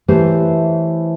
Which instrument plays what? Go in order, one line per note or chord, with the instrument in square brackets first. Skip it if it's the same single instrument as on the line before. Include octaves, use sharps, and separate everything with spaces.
[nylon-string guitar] E3 A3 G4 C5 C#5